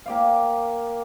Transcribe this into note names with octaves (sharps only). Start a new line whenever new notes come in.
A#3 G4 D5 F5